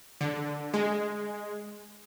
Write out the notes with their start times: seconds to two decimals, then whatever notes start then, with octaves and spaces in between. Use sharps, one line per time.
0.21 D3
0.74 G#3